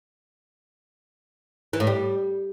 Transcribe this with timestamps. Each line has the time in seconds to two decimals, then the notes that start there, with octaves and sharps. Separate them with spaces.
1.73 E3
1.80 A2
1.87 G3